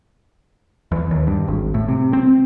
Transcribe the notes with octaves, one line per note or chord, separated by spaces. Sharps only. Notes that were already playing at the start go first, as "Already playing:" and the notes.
E2
D#2
G2
G#1
A2
C3
C4